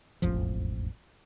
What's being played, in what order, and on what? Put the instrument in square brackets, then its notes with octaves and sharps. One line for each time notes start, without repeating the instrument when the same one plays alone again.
[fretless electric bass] E1 A1 F2 F3